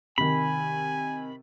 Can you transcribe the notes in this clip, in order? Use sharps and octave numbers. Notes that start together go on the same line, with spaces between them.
C3 D#3 G#5 B5